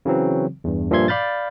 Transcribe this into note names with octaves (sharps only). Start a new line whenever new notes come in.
C#3 E3 F#3 C4
E2 G2
G2 A#2 F3 E5 C6 G#6
D5 F5 B5 F6 G6 A6